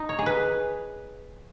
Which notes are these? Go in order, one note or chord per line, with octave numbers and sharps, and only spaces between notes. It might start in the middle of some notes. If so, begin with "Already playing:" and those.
Already playing: D#4
C#5
G#4
B4